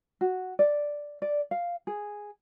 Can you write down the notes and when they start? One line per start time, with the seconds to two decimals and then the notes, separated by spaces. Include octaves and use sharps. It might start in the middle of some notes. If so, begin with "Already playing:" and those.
0.21 F#4
0.59 D5
1.22 D5
1.51 F5
1.87 G#4